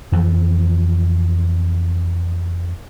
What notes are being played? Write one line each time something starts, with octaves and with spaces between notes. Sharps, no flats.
F2 E3 F3